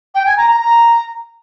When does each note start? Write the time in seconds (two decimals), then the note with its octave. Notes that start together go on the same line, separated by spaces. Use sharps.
0.15 G5
0.26 G#5
0.37 A#5
0.49 A#5
0.60 A#5